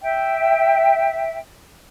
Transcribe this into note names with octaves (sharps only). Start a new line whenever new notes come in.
E5 G5